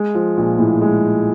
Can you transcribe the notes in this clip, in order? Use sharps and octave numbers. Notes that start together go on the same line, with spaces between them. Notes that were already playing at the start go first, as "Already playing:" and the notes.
Already playing: G#3
F3
A#1
A2
G#3